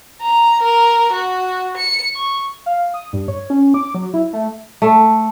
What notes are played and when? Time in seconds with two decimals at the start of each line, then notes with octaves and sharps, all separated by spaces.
0.22 A#5
0.62 A#4
1.12 F#4
1.77 C#7
2.15 C#6
2.66 F5
2.94 D#6
3.13 G2
3.28 C#5
3.50 C#4
3.74 D6
3.95 F#3
4.14 E4
4.33 A3
4.82 A3